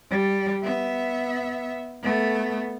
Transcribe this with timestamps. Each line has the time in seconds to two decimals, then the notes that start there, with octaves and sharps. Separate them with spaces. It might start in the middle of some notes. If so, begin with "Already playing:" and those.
0.10 G3
0.63 B3 E5
2.03 A3 B3